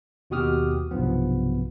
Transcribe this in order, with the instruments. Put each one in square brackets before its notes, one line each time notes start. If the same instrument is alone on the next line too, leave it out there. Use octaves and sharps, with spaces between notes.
[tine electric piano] D#2 B2 F#4 G4 D#6 F6
B1 G2 C3 F3 B3